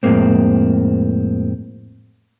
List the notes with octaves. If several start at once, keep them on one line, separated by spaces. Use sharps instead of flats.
F2 A2 C#3 G#3 A#3 C4